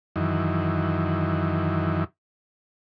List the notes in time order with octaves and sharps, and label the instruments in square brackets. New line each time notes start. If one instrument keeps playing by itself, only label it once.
[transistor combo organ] F#2 D#3 E3